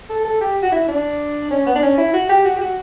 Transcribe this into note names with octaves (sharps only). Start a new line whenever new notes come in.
A4
A4
G4
F#4
E4
D4
C#4
B3
D4
C#4
E4
F#4
G4
F#4
G4
F#4